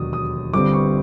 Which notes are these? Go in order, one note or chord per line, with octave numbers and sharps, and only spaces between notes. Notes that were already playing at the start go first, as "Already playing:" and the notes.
Already playing: E1 D#2 D3 F#3 D#6
D#6
G1 G2 D3 G3 C4 D6
C#6